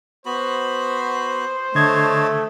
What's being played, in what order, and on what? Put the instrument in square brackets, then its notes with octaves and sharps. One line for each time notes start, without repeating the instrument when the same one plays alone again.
[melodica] B3 F#4 B5 [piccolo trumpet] C5
[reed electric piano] D3 G#6 [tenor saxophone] A3 [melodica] C#5 D#5 A5